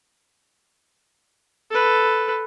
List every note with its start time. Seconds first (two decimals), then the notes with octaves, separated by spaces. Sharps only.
1.71 A4 B4